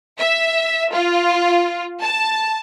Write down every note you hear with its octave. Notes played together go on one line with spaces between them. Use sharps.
E5
F4
A5